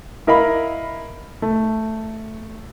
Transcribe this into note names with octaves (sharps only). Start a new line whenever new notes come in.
E4 A#4 D#5 F5 B5
A3